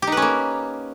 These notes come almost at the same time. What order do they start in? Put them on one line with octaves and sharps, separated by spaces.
G4 D#4 B4 C#4 A#3